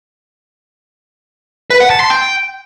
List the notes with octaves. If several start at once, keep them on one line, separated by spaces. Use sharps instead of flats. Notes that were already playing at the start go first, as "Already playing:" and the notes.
B4
F#5
A5
C6
G5